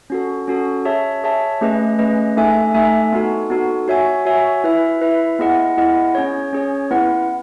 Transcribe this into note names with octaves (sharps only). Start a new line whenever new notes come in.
C#4 F#4 A4
C#4 F#4 A4
G#4 C#5 E5 A5
G#4 C#5 E5 A5
A3 C#4 G#4 B4 D#5
A3 C#4 G#4 B4 D#5
A3 D#4 A4 E5 G#5
A3 D#4 A4 E5 G#5
B3 D#4 F#4 A4
B3 D#4 F#4 A4
F#4 C#5 E5 G#5
F#4 C#5 E5 G#5
E4 B4 E5
E4 B4 E5
B3 E4 G#4 D#5 F#5
B3 E4 G#4 D#5 F#5
C#4 G#4 C#5
C#4 G#4 C#5
B3 E4 B4 F#5